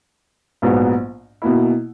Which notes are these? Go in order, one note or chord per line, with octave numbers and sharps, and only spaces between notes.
A#1 G#2 F#3 B3
B2 A#3 E4